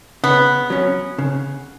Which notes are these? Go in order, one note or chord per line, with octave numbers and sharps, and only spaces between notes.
C#3 B3
F#3 C#4
C#3